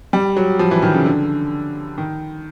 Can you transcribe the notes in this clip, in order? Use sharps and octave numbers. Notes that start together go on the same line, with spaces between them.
G3
F#3
F3
E3
D#3
C#3
D3
D#3